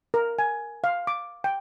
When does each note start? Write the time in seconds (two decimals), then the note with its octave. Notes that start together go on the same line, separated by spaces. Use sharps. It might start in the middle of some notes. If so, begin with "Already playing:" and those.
0.14 A#4
0.39 G#5
0.84 F5
1.07 D6
1.44 G5